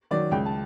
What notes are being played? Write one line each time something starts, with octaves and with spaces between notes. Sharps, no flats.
D#3 F#3 D5
C#2 G5
A5